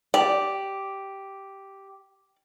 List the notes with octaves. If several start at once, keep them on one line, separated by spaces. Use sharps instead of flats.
G4 D5